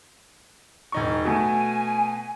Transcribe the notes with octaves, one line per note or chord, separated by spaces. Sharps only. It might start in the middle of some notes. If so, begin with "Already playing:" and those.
E1 D#4 C#6
B2 A3 G#5